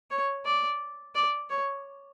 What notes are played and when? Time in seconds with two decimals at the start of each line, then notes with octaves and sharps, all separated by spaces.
0.11 C#5
0.45 D5
1.15 D5
1.50 C#5